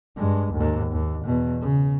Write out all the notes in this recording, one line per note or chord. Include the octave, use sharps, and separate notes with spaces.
G2 G#3
D#2 G#2
D#2
E2 B2
C#3